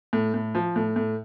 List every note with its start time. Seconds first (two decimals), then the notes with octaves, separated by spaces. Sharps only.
0.13 A2
0.34 A2
0.55 F3
0.76 A2
0.96 A2